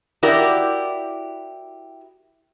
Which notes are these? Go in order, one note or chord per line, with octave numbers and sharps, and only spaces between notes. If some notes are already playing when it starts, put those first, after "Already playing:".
E4 F#4 G4 A#4 D5